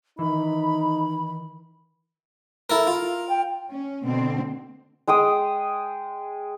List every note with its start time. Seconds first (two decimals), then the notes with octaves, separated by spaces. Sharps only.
0.19 D#3 E3 D#4 B5
2.70 E4 A4 A#4
2.87 F4 A#4
3.29 G5
3.70 C#4
4.04 B2 D3 C4
5.07 G#3 G#4 G5 D#6